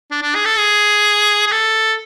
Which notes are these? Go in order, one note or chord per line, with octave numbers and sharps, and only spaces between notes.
D4
D4
G#4
A4
G#4
G#4
A4